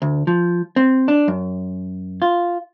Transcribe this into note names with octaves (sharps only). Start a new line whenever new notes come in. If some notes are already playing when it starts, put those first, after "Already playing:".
D2
F3
C4
D4
F#2
F4